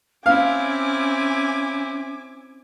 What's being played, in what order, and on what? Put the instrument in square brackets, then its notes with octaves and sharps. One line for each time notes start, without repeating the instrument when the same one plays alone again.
[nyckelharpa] C4 E4 [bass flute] C#4 [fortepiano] F5 [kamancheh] G#5 D6